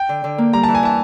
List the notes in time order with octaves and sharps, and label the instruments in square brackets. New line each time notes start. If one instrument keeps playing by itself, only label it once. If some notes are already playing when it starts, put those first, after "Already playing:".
Already playing: [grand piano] G5
[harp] D3
D3
A#3
[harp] G3 [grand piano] A#5
[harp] E3 [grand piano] A5
[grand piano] G#5
[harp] E3 [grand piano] A5